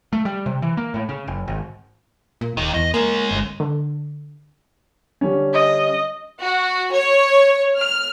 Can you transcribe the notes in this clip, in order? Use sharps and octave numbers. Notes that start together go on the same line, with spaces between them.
A3
G3
C3
E3
A#3
A2
C#3
F#1
G#1
A#2
D#1 D#2 D#3
E2 D#5
G#3 A#3 C#4
G1
D3
D3 G3 C#4
D#5
F#4
C#5
F6